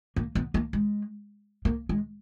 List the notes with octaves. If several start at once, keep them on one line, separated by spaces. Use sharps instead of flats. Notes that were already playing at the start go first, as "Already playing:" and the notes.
A#3
B3
A#3
G#3
A#3
G#3